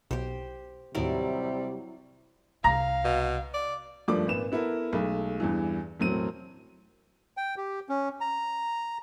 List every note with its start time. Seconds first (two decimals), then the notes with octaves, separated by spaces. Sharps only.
0.11 B1 G4 C5
0.95 D#2 A2 C3 D#3 F#3 G3 E4 D5
2.64 C2 F5 A#5
3.05 B2
3.54 D5
4.08 F#1 G2 F3 A3 D5 D6
4.26 G#1 A#2 B4 E7
4.52 B3 E4 A4 A#4
4.93 B1 G#3 A3
5.40 E2 G2 E3
6.00 E1 A2 F#3 C4 D#7
7.37 G5
7.57 G4
7.89 C#4
8.21 A#5